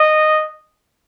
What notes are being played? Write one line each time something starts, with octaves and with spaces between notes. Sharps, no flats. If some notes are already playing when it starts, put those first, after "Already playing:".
Already playing: D#5